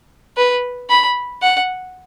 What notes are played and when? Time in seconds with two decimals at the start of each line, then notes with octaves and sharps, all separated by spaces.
0.37 B4
0.89 B5
1.42 F#5